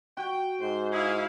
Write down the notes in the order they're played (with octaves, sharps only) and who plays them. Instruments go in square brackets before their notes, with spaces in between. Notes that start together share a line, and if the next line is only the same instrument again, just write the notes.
[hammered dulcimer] F#4 [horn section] G5
[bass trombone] G#2 [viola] C5
[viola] E4 F5 [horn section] G#4